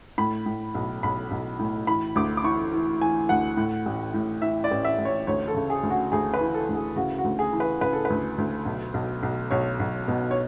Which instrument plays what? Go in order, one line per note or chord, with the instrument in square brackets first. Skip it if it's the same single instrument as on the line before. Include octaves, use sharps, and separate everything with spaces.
[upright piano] A2 B5
A2
B1
B1 B5
B1
A2
E3 B5
D2 D6
D6
E3 C#6
E3
E3 G#5
D2 F#5
A2
A1
A2
E3 E5
D5
A1
E5
A1
C#5
D2 C#5
A4
C#3
G#4
D2
F#4
D2 G#4
B4
E3
A4
D2
G#4
C#3 F#4
F#4
D2
G#4
E3
B4
C#3 B4
A4
B4
D2
D2
B1
B1
B1
B1 C#5
B1
B2
C#5